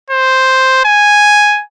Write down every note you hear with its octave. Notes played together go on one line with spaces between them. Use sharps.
C5
G#5